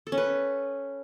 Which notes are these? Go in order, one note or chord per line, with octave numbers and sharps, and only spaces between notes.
A4
C#4
B4